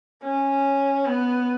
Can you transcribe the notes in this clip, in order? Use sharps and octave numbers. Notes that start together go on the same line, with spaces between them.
C#4
B3